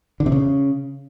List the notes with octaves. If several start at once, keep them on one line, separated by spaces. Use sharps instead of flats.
D3
C3
C#3